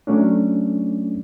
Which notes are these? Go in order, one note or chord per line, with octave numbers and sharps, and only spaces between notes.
F#3 A3 C#4 D4